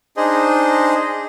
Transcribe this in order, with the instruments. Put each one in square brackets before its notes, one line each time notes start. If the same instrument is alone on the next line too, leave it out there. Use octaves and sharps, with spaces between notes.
[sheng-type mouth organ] D4 D#4 G#4 C5 D#5